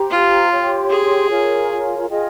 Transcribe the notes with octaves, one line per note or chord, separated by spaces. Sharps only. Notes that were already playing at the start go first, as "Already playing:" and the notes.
Already playing: G4 C5 G5 A#5
F4
G4 C#5 G5 C6
G#4
F4 A#4 C#5 G#5
F4 G#4 D#5 G5